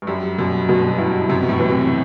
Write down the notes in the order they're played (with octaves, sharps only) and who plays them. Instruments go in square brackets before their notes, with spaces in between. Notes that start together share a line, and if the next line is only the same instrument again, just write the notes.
[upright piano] G2
[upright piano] F#2 [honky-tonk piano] G3
[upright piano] F#2 [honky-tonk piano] B2
[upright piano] G2 [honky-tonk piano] B2
[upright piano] G2 [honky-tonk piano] E4
[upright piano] F#2 [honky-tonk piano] C3
[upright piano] B2
A2
[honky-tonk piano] E3
[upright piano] C3